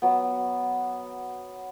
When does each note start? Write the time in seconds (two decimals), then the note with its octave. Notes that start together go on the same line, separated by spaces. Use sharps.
0.02 F#3 B3